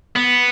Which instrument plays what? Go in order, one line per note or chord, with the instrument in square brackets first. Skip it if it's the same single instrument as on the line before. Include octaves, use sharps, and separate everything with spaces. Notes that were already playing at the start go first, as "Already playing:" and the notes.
[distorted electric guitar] B3